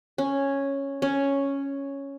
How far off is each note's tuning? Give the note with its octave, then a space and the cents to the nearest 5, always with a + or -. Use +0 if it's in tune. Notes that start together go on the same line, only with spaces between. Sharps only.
C#4 -5
C#4 +0